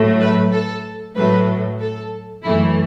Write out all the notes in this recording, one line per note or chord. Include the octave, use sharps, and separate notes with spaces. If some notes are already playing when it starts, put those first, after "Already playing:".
Already playing: A2 F#3 A3
B4
A4
A2 F#3 A3 B4
A4
F#2 E3 A3 E4